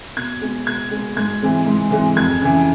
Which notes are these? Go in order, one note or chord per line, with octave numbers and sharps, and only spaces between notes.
B2 G#6
G#3 B3
B2 G#6
G#3 B3
G#2 G#6
E3 G#3 C4
G#2
E3 G#3 C4
F2 G#6
C#3 E3